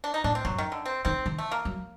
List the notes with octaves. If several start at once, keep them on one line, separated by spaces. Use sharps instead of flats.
D4
D#4
A2 D4
C4
F#2 F#3
D#3
D3
C4
D#3 C4
D#3
A3
A#3
F#3